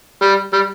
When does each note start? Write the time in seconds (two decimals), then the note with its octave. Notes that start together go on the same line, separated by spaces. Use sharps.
0.22 G3
0.53 G3